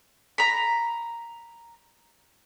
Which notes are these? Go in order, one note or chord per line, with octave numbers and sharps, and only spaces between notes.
A#5 B5